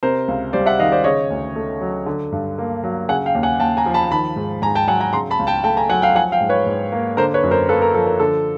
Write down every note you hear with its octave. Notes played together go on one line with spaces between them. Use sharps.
C3 A#4 C5
C#2
G3 C5 D5
E5 F#5
D#3 D#5 F5
C5 D5
C#3 C#5 D#5
D2
A3
F#3
D3
G2
A#3
F#3
C#3 F#5 G#5
F5 G5
D#2
F#5 G#5
D#2 G5 A5
G#5 A#5
F3
A5 B5
D#3 A5 B5
G#2
G#2 G#5 A#5
G5 A5
F#3 F#5 G#5
G#5 A#5
C#3 A#5 C6
A5 B5
C#2
G5 A5
A3 G5 A5
G#5 A#5
F#3 F#5 G#5
F5 G5
F3 F#5 G#5
F5 G5
G#2
B4 C#5
G#2
A#3
D3 A#4 C5
B4 C#5
F#2
A#4 C5
A#3 A4 B4
A#4
F3 A4
A#4
D3 A4